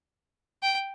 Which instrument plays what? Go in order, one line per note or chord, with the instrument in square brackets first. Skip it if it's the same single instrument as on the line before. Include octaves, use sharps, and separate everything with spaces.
[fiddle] G5